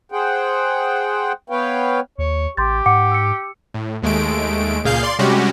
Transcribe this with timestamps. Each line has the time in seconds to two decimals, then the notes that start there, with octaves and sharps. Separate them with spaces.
0.12 G#4 C5 F#5 G5
1.50 B3 B4 C#5 F5 G5
2.18 D#2 C#5
2.57 A1 G4 C6 G6 A6
2.86 G#2 F#5 D6 C#7
3.11 E6 C#7
3.74 A2
4.02 D#2 G#3 A3 D7
4.84 C#2 A#2 G#4 F5 G6 C7
5.03 D5 C6
5.19 C3 G3 G#3 C#4 F#4 G4